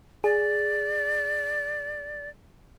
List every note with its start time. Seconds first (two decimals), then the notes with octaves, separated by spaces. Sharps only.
0.24 G#4 D5